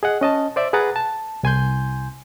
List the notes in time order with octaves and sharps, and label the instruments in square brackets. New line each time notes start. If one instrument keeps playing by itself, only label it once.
[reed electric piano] G#4 D#5 F#5
C#4 D#5 A5
C5 D5 E5
G#4 B4 F#5 A#5 A6
A5
C2 G#5 C6 G6